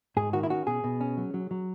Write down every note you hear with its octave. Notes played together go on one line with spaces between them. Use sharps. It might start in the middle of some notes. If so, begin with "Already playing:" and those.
G#2 G#4
D#3 F#4
E4
C#4 F#4
B2 G#4
B2
C#4
F#3
F#3
F#3